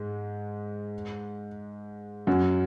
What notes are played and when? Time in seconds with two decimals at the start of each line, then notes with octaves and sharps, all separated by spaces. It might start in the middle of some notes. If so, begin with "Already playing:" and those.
Already playing: G#2 G#3
2.27 F#2 F#3